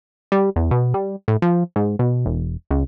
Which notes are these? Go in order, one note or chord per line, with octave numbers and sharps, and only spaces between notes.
G3
E2
B2
G3
A2
F3
G#2
B2
E1
C#2